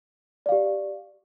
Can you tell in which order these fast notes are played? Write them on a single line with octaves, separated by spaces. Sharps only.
D5 F5 G4